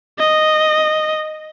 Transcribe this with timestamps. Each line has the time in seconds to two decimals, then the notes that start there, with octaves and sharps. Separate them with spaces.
0.19 D#5